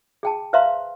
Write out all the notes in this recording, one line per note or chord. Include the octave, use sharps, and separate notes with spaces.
G#4 G5 A5
B4 C5 E5 F5 A#5 C6